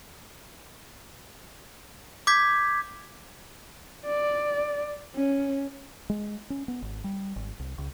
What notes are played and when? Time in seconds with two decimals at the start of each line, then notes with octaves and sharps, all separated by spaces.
2.27 D6 G6 G#6 B6
4.06 D5
5.15 C#4
6.10 G#3
6.50 C#4
6.68 B3
6.82 G#1
7.04 G3
7.36 G#1
7.60 C2
7.78 C#2